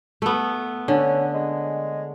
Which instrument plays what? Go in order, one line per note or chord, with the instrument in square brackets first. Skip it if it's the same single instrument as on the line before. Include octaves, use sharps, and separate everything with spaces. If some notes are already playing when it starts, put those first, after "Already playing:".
[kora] A3 B3
[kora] D3 [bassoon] C#4
[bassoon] G#3